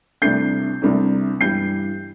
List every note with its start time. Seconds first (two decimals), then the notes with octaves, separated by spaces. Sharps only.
0.22 C2 C3 A3 D4 G6 C7
0.82 C2 C3 A3 D4
1.41 G2 E3 G3 G6 C7